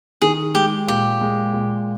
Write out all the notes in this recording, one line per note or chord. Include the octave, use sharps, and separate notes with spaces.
D#3 G#4
G#3 G4
A#2 G4
G#3
A#2